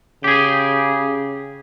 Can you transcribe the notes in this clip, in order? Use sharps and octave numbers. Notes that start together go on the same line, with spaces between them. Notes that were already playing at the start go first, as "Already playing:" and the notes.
C#3 G4 G#4